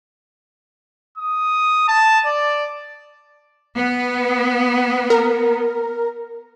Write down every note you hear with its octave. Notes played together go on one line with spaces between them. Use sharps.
D#6
A5
D5
B3
A#4